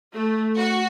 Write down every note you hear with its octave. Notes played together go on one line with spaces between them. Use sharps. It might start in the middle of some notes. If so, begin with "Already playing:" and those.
A3
F#4